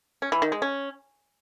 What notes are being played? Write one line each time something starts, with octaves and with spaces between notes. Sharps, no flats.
C#4
E3
D#3
G#3
C#4